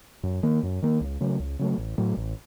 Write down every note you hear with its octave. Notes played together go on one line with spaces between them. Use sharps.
F#2
D#3 A#3
F#2
D#3 A#3
C#2
C#3 F#3 A3
C#2
C#3 F#3 A3
A1
A2 F#3 A3
A1